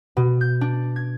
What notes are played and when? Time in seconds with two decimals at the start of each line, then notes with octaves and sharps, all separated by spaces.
0.17 B2
0.41 G6
0.61 D4
0.96 G#6